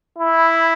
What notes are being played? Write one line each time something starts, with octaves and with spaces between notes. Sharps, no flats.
E4